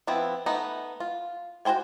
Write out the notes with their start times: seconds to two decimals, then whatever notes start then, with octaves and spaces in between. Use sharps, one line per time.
0.07 F3 B3 C4 E4
0.46 A3 B3 D#4
1.00 F4
1.65 F#4 A4 C5 G5 G#5